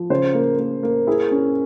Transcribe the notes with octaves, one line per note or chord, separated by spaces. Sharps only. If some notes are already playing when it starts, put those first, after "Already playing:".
Already playing: F3
C#3 C5
A#3
A#3
A#3
E4 G#4
C#4